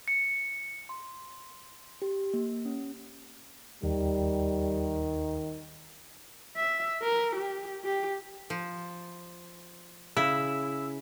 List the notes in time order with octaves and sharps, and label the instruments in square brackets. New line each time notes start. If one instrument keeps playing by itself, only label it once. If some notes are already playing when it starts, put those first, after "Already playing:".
[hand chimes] C#7
C6
G4
A#3
C#4
[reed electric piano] D#2 [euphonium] D#3 [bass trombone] G3
[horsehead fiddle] E5
A#4
G4
G4
[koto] F3
[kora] C#3 [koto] E4 [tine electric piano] E6